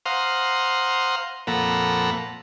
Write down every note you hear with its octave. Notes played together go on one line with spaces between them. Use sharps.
C5 F5 F#5 A#5 C6 D#6
F2 A#2 A4 F#5 A#5 B5